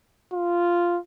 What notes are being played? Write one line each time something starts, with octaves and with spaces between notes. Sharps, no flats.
F4